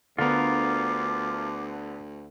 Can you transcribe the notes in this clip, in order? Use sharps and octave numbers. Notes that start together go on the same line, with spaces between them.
D2 D3 B3 F4 A#4 D6